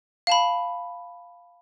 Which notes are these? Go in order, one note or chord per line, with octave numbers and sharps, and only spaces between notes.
F5 A5 B5